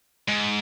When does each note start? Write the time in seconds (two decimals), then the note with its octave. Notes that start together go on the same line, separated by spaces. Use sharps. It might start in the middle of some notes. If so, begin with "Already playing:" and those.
0.28 G#2